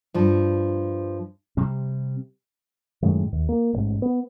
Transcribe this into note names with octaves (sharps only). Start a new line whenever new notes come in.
G2 F3
C3 G3 C4
F#2 A2 D#3 G#3
D#2
A#3
D1 A1 G#2
B3